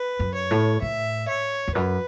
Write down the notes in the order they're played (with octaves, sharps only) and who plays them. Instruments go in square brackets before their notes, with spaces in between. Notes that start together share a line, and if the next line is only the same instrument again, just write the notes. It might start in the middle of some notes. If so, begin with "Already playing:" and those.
Already playing: [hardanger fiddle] B4
[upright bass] F#2
[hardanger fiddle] C#5
[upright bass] A2
[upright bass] A2 [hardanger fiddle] E5
[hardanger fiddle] C#5
[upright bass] E2
[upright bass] F#2 [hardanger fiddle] B4